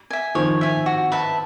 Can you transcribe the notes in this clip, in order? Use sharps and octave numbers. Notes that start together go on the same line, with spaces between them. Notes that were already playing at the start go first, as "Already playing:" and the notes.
E5 G#5
D#3 F3 C#5
E5 G#5
F#4
B4 E5 A5